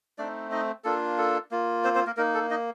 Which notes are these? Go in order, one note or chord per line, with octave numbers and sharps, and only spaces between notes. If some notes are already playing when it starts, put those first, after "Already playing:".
A3 C4 D4 D#4 D5
D#4 D#5
A#3 D4 F4 A4
A4
A#3 F4
C4 C5
C4 C5
A#3 A#4
A#3 D#4 A#4
A4
D#4 D#5